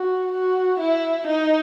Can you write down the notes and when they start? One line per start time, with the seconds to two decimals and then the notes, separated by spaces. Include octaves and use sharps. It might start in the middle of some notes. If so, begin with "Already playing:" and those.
Already playing: F#4
0.32 F#4
0.80 E4
1.27 D#4